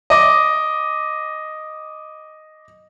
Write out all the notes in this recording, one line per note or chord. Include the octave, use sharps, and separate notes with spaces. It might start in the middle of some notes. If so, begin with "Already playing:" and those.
D#5 D6